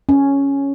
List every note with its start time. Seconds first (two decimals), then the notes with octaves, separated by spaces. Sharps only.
0.09 C#4